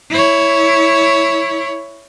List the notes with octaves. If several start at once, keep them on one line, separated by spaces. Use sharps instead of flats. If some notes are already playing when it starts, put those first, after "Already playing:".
E4 C#5